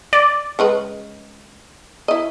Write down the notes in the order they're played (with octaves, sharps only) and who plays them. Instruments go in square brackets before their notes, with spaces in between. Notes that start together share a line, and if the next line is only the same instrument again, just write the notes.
[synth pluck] D5
[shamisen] C#3 G#3 B4
E4 D#5